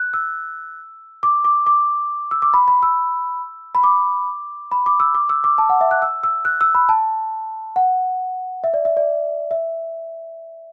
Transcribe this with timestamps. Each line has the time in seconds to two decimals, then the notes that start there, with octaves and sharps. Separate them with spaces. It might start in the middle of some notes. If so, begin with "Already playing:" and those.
Already playing: F#6
0.14 E6
1.23 D6
1.44 D6
1.66 D6
2.31 E6
2.42 D6
2.54 B5
2.68 B5
2.83 E6
3.75 B5
3.84 D6
4.72 B5
4.86 D6
5.00 E6
5.14 D6
5.29 E6
5.44 D6
5.58 A5
5.69 F#5
5.81 E5
5.91 F#6
6.02 E6
6.24 E6
6.45 F#6
6.61 E6
6.75 B5
6.89 A5
7.76 F#5
8.64 E5
8.74 D5
8.85 E5
8.97 D5
9.51 E5